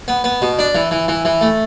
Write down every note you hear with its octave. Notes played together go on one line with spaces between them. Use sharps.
B3
B3
B2
D4
E3
E3
E3
E3
A3